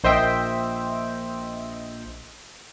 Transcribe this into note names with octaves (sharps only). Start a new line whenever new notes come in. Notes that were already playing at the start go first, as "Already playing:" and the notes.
A#1 C5 D#5 E5 G5